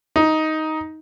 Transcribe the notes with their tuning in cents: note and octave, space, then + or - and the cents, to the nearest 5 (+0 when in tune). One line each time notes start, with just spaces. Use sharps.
D#4 +10